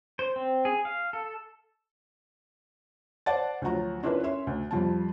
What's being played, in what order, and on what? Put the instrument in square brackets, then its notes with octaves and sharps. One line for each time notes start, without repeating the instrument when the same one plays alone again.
[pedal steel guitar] C5
C4
G#4
F5
A4
[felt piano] C5 D5 F#5 A5 A6
D2 F3 F#3 F#4 A#5
C#4 D4 E4 F4 A#4 B4
C#4 C#5 E5 C6
D2
F2 G3 F4 A5